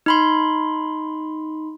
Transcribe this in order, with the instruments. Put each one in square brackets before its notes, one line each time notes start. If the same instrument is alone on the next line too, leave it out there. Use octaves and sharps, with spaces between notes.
[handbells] D#4 B5 C6